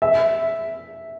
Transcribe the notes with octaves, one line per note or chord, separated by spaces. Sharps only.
E5